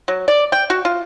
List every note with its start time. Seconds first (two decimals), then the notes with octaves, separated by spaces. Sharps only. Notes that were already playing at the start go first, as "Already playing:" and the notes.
0.08 F#3
0.28 D5
0.52 G5
0.70 F#4
0.85 F4